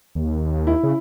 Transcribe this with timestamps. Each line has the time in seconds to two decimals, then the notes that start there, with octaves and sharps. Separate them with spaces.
0.15 D#2
0.67 E4
0.83 C#3